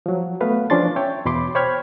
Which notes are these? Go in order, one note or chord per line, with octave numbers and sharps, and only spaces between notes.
F3 F#3
A3 B3 B4 F5
F3 C#4 D4 C6 A6
C#5 E5 G5
E2 B2 B5 C6 D6
C5 C#5 G5 B5 F6 G#6